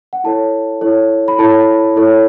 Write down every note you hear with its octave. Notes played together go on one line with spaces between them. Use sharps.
F#5
E4 A4 C#5 A5
E4 A4 C#5
B5
E4 A4 C#5 A5
E4 A4 C#5